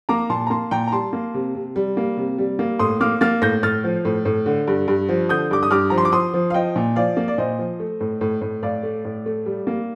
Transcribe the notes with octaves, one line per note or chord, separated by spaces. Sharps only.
A#3 A#5 D6
A#2 A5 C6
A#5
A#3 A5 C6
A#2 G5 A#5
A#5
G3 A5 C6
A#3
C3
C3
G3
A#3
C3
G3
A#3
A2 C6 D#6
A#3 D6 F6
A#3 F6 A6
A2 G6 A#6
A2 F6 A6
F3
A2
A2
D3
G2
G2
F3
D3 D#6 G6
G2 D6
D#6
G2 D6 F6
F3 A#5
C6
D6
F3 C6 D#6
F3
F5
F3 D#5 G5
A#2
F3 D5 F5
A#3
D5
A#2 C5 D#5
F3
A3
A2
A2
A2
A2 D5 F5
A3
A2
A3
G3
A#3